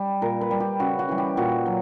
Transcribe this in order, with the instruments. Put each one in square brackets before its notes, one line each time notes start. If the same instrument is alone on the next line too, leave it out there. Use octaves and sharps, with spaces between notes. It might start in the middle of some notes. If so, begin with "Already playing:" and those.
Already playing: [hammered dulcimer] G3
A#2 A#4
B4
G3
G4
C#3 F#4
F#4
E3 G3
G4
A#2 F#4
F#3